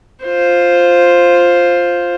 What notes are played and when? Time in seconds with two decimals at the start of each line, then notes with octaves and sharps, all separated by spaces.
0.25 F4 C5